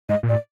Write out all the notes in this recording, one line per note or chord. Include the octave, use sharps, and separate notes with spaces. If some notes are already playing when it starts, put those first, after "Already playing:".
G#2 D#5
A#2
A2 D5